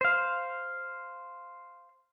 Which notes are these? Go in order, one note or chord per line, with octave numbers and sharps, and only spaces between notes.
C5 F5